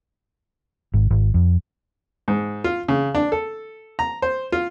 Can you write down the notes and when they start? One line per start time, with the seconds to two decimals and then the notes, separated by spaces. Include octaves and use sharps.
0.94 G#1
1.11 G#1
1.34 F2
2.28 G#2
2.64 F4
2.88 C#3
3.15 D4
3.32 A4
3.99 A#5
4.22 C5
4.52 F4